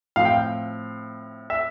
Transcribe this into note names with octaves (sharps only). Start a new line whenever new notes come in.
A2 F3 C4 F5
G5
F5
E5